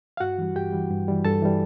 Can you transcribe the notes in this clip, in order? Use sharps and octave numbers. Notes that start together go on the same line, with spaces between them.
F5
G2 F#4 F#5
E3 G3
G2 G4 G5
E3 G3
G2
E3 G3
G2 A4 A5
E3 G3